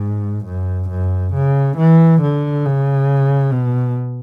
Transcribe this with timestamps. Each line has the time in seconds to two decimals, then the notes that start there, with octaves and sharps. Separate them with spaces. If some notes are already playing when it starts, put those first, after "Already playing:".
Already playing: G#2
0.45 F#2
0.89 F#2
1.34 C#3
1.77 E3
2.21 D3
2.65 C#3
3.53 B2